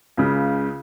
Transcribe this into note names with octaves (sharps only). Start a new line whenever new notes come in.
C#2 C#3